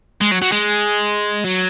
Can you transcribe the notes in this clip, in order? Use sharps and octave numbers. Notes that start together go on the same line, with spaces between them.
G#3
F#3
F#3
G#3
F#3